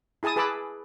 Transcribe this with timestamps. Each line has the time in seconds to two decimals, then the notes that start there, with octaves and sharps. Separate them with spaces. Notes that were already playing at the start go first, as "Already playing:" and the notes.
0.23 E4 G#4 G#5 A5 D#6
0.36 G#4 B4 A5 B5 D6 E6